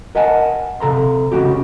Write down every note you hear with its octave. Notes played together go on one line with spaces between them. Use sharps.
A#4 D#5 F#5 G#5 A5
C3 A4 A#5 C6
C#2 C#3 A3 F#4 G4